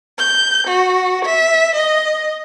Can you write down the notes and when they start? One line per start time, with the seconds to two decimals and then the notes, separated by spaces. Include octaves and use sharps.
0.18 G6
0.66 F#4
1.24 E5
1.75 D#5